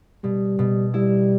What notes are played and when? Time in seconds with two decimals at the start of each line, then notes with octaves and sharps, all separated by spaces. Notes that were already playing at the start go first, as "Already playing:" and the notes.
0.24 B2 G3
0.59 B2
0.94 G3 E4